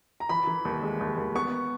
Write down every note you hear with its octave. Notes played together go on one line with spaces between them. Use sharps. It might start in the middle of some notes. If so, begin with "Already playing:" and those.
A#5
E3 B5
E3
D#2
G#3
D#2
D#2
B3 C#6